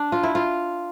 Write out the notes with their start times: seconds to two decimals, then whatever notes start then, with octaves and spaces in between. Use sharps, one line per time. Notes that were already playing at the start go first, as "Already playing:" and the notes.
Already playing: D4
0.12 F4
0.23 E4
0.35 F4